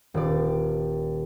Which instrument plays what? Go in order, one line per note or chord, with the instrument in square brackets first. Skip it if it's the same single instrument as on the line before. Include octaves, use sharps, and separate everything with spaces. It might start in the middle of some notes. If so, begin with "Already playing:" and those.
[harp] D#1 D5